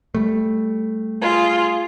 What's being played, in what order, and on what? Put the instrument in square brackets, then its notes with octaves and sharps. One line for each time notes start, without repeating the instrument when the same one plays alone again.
[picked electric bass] G3 A3
[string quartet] F4 G#4